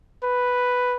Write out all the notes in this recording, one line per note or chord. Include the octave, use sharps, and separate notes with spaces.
B4